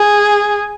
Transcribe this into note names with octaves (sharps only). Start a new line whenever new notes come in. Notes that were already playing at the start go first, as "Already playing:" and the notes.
Already playing: G#4